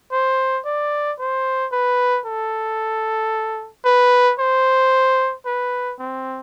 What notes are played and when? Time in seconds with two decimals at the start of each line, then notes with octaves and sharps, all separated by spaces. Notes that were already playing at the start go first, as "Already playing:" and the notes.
0.12 C5
0.65 D5
1.19 C5
1.72 B4
2.26 A4
3.85 B4
4.39 C5
5.46 B4
5.99 C4